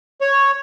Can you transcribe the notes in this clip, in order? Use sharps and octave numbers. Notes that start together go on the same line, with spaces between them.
C#5